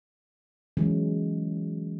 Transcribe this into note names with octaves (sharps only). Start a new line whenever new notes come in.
E3 F#3 G#3 C#4